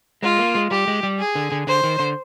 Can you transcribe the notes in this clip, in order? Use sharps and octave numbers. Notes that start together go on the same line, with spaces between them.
G#3 F4
A#3
G#3
G3 G4
G#3
G3
G#4
D3
D3
D3 C5
D#3
D3